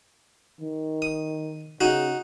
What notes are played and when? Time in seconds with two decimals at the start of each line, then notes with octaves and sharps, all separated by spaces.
0.60 D#3
1.02 D#6
1.81 C#3 D#4 F#4